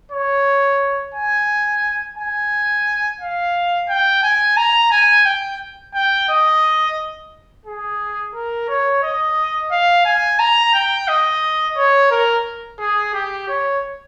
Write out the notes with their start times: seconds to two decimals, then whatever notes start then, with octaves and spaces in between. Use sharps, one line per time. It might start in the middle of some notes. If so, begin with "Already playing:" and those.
0.11 C#5
1.14 G#5
2.18 G#5
3.20 F5
3.89 G5
4.23 G#5
4.57 A#5
4.91 G#5
5.25 G5
5.94 G5
6.29 D#5
7.66 G#4
8.34 A#4
8.69 C#5
9.03 D#5
9.71 F5
10.06 G#5
10.39 A#5
10.74 G5
11.08 D#5
11.77 C#5
12.11 A#4
12.80 G#4
13.14 G4
13.48 C#5